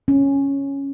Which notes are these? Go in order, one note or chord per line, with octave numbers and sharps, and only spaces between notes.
C#4